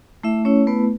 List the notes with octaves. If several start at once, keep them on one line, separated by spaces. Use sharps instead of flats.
A3 E4 E5
C#4 E4 C#5
A3 B3 B4